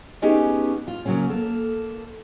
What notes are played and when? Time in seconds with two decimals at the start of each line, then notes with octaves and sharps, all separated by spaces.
0.22 A3 B3 C#4 D#4 G4 G#4
0.88 F4
1.05 C#3 F#3 A#3 C#4
1.30 A#3 A4